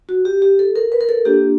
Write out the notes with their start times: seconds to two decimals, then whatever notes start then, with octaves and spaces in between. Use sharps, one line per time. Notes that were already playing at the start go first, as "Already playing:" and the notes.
0.09 F#4
0.25 G4
0.42 G4
0.59 A4
0.76 A#4
0.92 B4
1.01 A#4
1.09 A4
1.26 A#3 D4 F4 G4